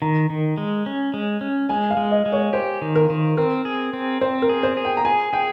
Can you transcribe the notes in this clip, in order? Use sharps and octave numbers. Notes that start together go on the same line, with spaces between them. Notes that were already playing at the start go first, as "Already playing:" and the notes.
D#3 A#5
D#3
G#3
C#4
G#3
C#4
G#3 G#5
F5
G#3
D#5
G#3
C#5
G4 C5
D#3
A#4
D#3
C4 A#4
G#4
C4
C4 C5
A#4
G#4
C5
G#4
G5
A#5
G#4 G#5
G#4 G5